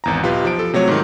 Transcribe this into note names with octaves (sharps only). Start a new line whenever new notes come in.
G#1 E2 A#5
B1 F4 G4 B4
F3 D7
A4
C3 F#3 A3 C#5
G#2 D#3